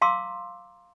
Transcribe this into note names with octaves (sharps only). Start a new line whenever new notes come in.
F5 A#5 C6 D6 E6